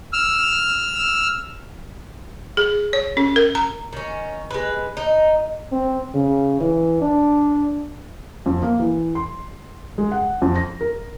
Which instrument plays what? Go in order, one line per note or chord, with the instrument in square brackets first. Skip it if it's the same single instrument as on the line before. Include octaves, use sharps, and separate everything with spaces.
[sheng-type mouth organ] E6 F6
[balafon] G#4
C#5
C#4
A#4
A#5
[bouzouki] D#3 C#4
G#3 B4
D#4
[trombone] C4
C#3
E3
D4
[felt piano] F2
A#3
E3
C6
G#3
F#5
F2
A#6
A#4